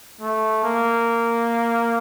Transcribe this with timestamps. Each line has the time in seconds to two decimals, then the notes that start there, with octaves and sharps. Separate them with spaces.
0.21 A3
0.64 A#3